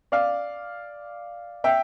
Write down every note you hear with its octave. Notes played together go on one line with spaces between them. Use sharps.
D5 F5
E5 G5